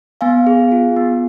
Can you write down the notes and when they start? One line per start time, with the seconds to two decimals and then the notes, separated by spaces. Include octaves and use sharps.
0.21 B3 F5 G#5
0.47 G#4
0.72 F4
0.96 B3